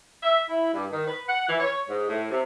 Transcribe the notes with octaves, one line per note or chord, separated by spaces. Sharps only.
E5
E4
G2
D#3
B4
F#5
E3
C#5
G#2
A2
C3